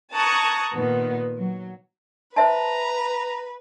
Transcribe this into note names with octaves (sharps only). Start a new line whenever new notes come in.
A5 A#5 C#6 D#6 F#6 G#6
A#2 D#3 B3
F#3
B4 C5 E5 A5 A#5